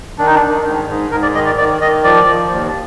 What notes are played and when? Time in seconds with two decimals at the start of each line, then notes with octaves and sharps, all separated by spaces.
0.18 D#3 D4
0.27 D#4
0.35 D4
0.42 D#3
0.65 G#2
0.88 G#2
1.11 G#2 A#4
1.22 D5
1.34 D#3 D#5
1.46 D5
1.58 D#3 D5
1.81 D#3 D#5
2.04 F3 D5
2.27 F3
2.51 D#2